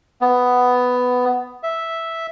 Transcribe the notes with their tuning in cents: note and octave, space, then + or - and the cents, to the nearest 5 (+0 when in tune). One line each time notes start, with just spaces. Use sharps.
B3 +10
E5 -5